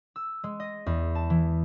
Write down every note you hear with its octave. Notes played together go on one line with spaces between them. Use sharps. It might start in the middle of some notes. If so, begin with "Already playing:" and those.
E6
G#3
D#5
E2
A5
E3